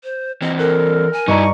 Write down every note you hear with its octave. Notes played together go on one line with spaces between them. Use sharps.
C5
E3 C4 D#5
A4 A#4 F#6
G#5
G2 D#4 E4 D#5 A#5 C#6